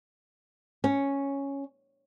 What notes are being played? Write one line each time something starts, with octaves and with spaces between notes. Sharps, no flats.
C#4